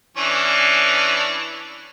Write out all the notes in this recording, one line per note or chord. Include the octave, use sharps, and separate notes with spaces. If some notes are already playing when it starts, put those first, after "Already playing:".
E3 C#4 D4